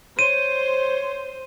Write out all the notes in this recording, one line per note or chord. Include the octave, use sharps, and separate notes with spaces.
C5 C#5 D#7